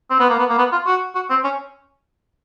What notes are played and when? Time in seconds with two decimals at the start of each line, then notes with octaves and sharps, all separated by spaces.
0.10 C4
0.20 B3
0.29 A#3
0.39 B3
0.49 A#3
0.58 B3
0.72 F4
0.87 F#4
1.15 F#4
1.30 C4
1.44 C#4